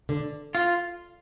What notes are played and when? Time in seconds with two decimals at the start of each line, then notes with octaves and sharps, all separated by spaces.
0.09 D3
0.55 F4